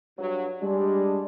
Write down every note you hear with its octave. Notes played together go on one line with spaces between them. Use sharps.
G2 F#3
G3 G#3 D4